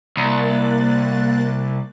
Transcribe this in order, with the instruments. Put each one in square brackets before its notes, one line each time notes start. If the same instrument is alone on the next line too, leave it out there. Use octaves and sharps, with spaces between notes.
[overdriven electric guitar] C2 [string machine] A#3 F#6 A6